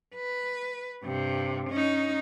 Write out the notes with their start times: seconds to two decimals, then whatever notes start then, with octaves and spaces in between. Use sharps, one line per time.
0.15 B4
1.04 G2 C3
1.70 C#4 D#4